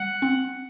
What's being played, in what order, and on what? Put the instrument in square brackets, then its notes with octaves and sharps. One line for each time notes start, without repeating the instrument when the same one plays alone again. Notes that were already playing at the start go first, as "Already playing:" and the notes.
Already playing: [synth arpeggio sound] G3 [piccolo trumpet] F#5
[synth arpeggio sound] C4